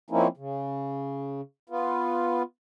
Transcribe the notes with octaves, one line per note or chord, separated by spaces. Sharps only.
F3 A#3 C4 C#4 D#4 E4
C#3
B3 F4